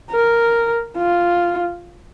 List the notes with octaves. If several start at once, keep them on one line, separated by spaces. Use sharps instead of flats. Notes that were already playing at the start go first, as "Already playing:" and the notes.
A#4
F4